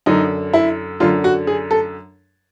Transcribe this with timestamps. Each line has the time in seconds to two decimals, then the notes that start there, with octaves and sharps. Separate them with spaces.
0.06 F#2 D3 D#4
0.54 E4
1.00 F#2 D3 F4
1.24 F#4
1.47 G#4
1.71 A4